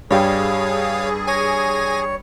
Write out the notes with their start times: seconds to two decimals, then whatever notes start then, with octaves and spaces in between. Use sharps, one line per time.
0.11 G2 G3 G#4 C#5 F5 G5
1.27 C#5 G#5 G#6 A#6